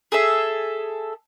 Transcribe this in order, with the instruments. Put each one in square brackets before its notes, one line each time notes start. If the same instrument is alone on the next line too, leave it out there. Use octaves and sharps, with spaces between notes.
[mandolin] G#4 A4 E5